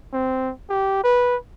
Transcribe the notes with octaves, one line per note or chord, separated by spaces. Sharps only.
C4
G4
B4